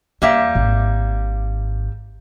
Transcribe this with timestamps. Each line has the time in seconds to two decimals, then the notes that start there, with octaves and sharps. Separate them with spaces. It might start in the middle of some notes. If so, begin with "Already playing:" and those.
0.22 E2 G3 A#3 E5
0.55 G#1